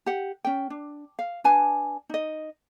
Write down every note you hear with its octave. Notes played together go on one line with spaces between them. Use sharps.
G4 F#5
C#4 G5
D4
F5
D4 B4 G#5 A5
D#4 D#5